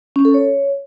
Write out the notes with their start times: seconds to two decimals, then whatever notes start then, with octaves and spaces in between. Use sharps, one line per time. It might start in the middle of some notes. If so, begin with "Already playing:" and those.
0.16 C#4
0.25 A4
0.34 C#5